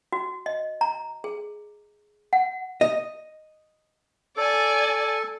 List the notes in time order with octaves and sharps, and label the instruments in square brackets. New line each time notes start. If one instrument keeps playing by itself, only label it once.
[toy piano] F#4
D#5
A#5
G#4
F#5
[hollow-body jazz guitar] D#5
[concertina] A4 [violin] D5 G#5